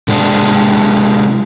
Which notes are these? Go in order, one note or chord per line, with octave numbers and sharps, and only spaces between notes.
C3 G#3 D4